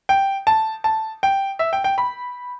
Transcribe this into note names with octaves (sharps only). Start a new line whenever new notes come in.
G5
A5
A5
G5
E5
G5
G5
B5